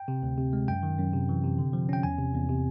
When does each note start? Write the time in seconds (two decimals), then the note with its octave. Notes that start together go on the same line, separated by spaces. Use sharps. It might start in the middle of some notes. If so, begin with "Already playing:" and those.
Already playing: G5
0.08 C3
0.23 D2
0.38 C3
0.53 G#3
0.68 F#2 G5
0.83 D#3
0.98 F#2
1.14 C3
1.29 E3
1.44 C3
1.59 D3
1.73 F3
1.89 C#4 G5
2.03 E2 G#5
2.19 C3
2.34 E2
2.49 C3